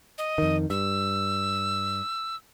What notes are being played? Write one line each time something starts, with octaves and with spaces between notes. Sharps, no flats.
D#5
F2 D#3
G2 E6